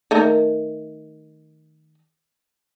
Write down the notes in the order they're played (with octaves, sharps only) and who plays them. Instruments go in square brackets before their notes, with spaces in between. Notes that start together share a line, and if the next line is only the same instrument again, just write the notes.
[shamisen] D#3 A3 A#4